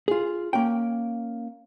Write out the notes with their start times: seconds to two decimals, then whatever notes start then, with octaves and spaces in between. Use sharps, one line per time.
0.08 F4 G#4
0.53 A#3 C#4 G5